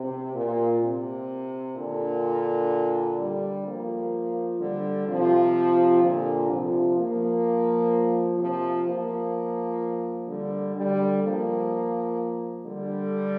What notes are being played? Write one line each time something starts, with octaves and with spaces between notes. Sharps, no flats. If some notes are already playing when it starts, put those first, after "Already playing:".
Already playing: C3
A#2
C3
A#2 D3
D3 G3
F3 A#3
D3 G3
C3 F3
A#2 D3
C3 F3
F3 A#3
C3 F3
F3 A#3
D3 G3
D3 G3
F3 A#3
D3 G3